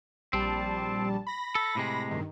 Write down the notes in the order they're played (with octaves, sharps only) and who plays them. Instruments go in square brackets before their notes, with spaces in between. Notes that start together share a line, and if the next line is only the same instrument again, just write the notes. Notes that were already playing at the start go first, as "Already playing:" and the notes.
[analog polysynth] A#1 G3 A5 [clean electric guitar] C4
[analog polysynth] B5 A#6
[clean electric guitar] A4
A2 C3 G#3
[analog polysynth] G2 D#3